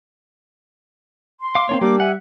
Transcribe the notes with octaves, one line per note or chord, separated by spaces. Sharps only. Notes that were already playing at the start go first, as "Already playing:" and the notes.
C6
F5 D6
A#3 C4 D4 C#5
G3 A#3 D4 D6
E5 F#5 G#5